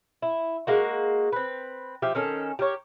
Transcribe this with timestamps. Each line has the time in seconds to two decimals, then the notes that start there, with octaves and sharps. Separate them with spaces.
0.22 E4
0.67 G#3 A#3 F#4
1.32 C4 B4
2.02 F3 G4 E5
2.15 D#3 C#4 A4
2.59 G4 A#4 C#5